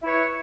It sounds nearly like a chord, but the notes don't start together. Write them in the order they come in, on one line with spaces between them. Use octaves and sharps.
E4 B4 C#5